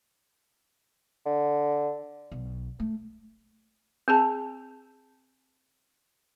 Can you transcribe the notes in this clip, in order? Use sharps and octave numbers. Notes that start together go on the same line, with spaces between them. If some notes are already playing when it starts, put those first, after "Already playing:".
D3
B1
A3
C4 G#4 A5